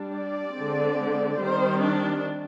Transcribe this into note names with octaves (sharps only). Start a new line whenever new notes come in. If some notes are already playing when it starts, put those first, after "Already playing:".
Already playing: G3 D4
D5
D3 G#3 C4
D#3 G3 C4 C5
D4